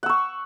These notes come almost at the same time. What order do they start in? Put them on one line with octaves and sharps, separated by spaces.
F#5 E6 C#6